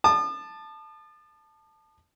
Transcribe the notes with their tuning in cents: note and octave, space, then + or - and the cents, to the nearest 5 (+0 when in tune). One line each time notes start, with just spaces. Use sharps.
A5 +0 D#6 -45